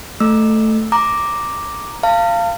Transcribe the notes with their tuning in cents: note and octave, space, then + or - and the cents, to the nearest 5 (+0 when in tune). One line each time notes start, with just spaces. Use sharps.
A3 +0 E6 -5
A#5 +0 D6 +0
F5 -20 A5 +45